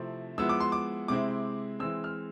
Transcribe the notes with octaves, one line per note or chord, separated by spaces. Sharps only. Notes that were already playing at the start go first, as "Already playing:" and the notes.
Already playing: C3 F3 A3 C4 E4
F3 G#3 B3 E4 E6
D6
C6
D6
C3 G#3 C4 E4 D6
E3 G#3 C4 E6
F6